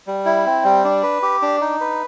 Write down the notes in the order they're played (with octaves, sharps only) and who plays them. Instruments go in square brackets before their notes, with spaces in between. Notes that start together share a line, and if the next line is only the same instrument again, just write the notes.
[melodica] G3
E4
C4
G3
D4
B4
G4
D4
D#4
B4